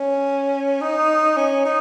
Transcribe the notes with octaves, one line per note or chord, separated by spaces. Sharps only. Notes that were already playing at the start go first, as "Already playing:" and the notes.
Already playing: C#4
D#4
C#4
D#4